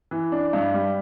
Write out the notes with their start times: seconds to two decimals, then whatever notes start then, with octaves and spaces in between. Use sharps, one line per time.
0.11 E3
0.32 D4
0.53 G2
0.74 G3